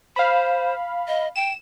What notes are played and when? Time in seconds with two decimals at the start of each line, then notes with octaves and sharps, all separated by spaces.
0.16 C5 F5 B5
1.08 D#5
1.36 G5 E7